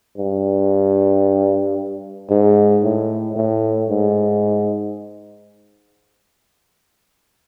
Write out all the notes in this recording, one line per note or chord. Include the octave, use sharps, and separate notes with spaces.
G2
G#2
A2
A2
G#2